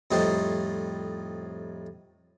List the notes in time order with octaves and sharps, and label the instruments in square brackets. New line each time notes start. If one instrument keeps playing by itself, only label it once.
[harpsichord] F2 A2 G3 D#4 C5